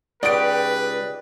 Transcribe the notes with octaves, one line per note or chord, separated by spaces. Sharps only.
C#2 D#4 F4 G4 B4 D5 D7